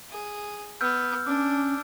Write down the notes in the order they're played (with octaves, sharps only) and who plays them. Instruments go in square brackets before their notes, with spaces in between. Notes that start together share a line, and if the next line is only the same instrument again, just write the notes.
[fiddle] G#4
[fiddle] B3 [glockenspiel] E6 F6 G6
[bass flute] C#4 [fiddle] D4 [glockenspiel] D6